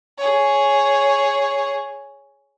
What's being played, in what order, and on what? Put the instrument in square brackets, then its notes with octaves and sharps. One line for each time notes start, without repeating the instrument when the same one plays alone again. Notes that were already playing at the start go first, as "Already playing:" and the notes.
[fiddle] G#4 C#5